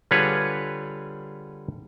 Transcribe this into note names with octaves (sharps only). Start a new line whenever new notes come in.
D3 G3 F4 G#4 B4 C#5